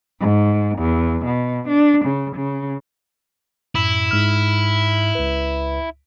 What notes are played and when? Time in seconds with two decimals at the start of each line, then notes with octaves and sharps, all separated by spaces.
0.21 G#2
0.79 E2
1.26 B2
1.68 D4
2.06 C#3
2.36 C#3
3.75 F#2 A2 E4 B5
4.11 G#2 F6
5.15 C#2 B4